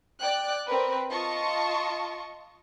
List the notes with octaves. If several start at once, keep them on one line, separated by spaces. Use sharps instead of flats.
D5 G5 F#6
C4 A#4 B4
F4 D#5 A5 C#6